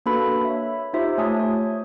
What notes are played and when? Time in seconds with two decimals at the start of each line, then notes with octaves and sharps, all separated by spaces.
0.06 A#3 D4 F#4 A4 B4 B5
0.45 C#5 E5
0.93 D#4 F4 G4 C5 E5
1.18 A3 C#5 G#5 A5 D#6
1.40 C#5